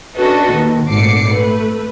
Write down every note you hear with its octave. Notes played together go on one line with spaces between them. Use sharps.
C#4 D4 F#4 A4 B4 D#5
D#2 D#3
G#1 A#2 A3 D6 C7 C#7
A3 B4